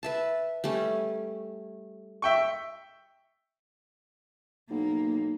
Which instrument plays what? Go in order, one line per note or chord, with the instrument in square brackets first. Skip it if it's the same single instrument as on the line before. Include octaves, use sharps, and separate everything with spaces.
[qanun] B4 E5 A5
G3 A3 C#4
[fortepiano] E5 G5 C#6
[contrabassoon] B1 [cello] A#3